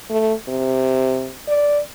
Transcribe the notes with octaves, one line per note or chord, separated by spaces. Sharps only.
A3
C3
D5